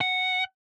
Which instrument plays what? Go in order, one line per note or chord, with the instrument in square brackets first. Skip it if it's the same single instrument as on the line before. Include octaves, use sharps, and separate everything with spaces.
[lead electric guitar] F#5